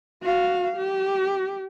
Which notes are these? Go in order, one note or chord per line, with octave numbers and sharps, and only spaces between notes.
F#4 F5
G4